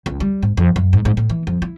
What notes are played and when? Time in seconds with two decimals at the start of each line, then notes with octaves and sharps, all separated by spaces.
0.06 C#2
0.20 G3
0.43 G#2
0.57 F2
0.76 F#2
0.93 G#2
1.05 G#2
1.17 A2
1.30 E3
1.47 F2
1.62 E4